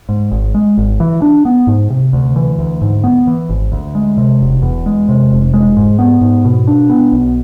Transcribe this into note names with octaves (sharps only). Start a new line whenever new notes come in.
G#2
G#1
G#3
G#1
E3
D4
B3
G#2
C3
D2
E3
D2
G#2
B3
E3
G#1
D2
G#3
C3
E1
E2
G#3
C3
F1
G#3
G#2
B3
G#2
B2
D4
B3
B1